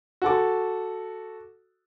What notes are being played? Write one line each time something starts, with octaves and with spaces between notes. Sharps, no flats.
F#4 A4 D6